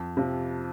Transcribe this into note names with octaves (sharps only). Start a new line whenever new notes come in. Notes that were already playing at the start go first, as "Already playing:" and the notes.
Already playing: F2
C3 F3